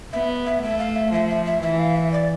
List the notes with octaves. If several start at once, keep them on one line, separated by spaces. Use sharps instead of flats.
B3 E5
E5
A3 E5
F5
E5
F3 E5
E5
E5
E3 E5
F5
E5
D5